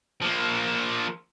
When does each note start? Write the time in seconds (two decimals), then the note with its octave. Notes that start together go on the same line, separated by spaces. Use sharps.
0.22 F3 A#3